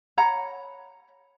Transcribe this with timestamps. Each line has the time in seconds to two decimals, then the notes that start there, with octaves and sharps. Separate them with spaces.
0.18 C#5 F#5 A#5 B5